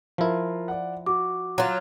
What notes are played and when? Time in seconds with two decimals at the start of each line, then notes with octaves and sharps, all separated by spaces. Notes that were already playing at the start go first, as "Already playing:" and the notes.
0.18 F3 E4 F4 A#4
0.68 D5 F#5
1.06 F#4 D6
1.58 F#3 F4